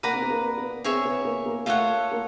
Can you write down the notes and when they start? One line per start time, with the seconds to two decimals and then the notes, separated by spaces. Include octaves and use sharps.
0.03 A#3 B4 D5 F#5 A#5
0.13 C4
0.22 B3
0.30 A#3
0.57 B3
0.84 C4 G#4 C#5 E5
1.05 B3
1.25 A#3
1.46 A#3
1.66 A3 F4 A4 C#5 F#5
2.11 A#3